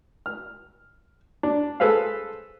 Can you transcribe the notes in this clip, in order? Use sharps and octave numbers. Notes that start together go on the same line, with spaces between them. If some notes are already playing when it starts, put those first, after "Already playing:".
F6
D4
G#4 A4 B4 C5 F5